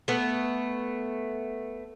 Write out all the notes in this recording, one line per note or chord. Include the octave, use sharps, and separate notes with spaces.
A3 B3